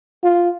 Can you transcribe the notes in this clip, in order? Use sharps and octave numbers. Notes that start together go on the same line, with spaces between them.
F4